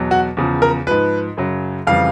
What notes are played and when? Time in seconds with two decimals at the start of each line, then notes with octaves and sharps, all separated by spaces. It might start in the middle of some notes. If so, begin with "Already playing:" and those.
Already playing: E2 B2 F#3
0.11 F#4
0.37 E2 C#3 F3
0.62 A#4
0.87 G#2 F3 B4
1.37 F#2 C#3 F#3
1.87 F2 C#3 E3 G3 F5